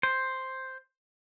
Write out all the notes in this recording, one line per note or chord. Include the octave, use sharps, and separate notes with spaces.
C5